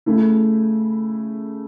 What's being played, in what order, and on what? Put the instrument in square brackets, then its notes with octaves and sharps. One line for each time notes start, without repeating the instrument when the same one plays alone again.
[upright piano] C#3 A3 E4